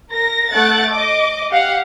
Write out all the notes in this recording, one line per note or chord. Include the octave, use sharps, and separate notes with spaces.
A#4 A#6
A3 F#5 F#6 A6 D7
D#5 D6
G4 F5 F#5